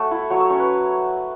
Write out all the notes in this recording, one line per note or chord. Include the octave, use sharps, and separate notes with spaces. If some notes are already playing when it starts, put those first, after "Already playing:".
Already playing: A3 F#4 A4 C#5 E5
E4
F#3 C#5
E5
C#4 C#5
B4